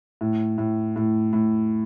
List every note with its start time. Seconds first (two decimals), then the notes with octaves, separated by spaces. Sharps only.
0.21 A2
0.58 A2
0.96 A2
1.33 A2